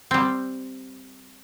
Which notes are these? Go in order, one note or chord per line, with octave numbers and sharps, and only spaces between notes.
G3 C4